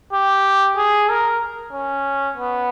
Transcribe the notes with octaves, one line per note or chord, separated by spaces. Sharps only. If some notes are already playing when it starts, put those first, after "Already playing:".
G4
G#4
A#4
C#4
B3